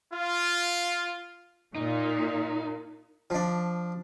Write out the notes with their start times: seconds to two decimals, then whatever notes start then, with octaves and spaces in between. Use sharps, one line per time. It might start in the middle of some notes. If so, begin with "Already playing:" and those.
0.12 F4
1.76 A#2 D#4
3.30 F3 D4